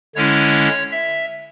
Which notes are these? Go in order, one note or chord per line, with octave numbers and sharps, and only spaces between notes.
D3 G#3 C#4 E4 C#5
E5